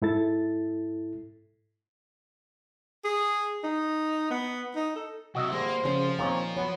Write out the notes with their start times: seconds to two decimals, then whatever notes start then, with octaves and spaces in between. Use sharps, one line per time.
0.02 G#2 E4 A4 A6
3.04 G#4
3.63 D#4
4.30 B3
4.75 D#4
4.96 A4
5.35 C3 F#3 F#4 D#5 E5
5.52 G#1 G3 A#3 C5
5.84 C#3 F3 C#4 G#4
6.19 A#2 D#3 A#3 C4 C#5
6.57 F#3 B3 C#5